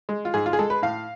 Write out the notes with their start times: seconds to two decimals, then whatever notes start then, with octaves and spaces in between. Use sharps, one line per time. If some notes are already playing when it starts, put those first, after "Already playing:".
0.09 G#3
0.25 F4
0.34 G#2 G#4
0.46 F4
0.53 G#4
0.59 G#3 A4
0.70 B4
0.82 A2 F5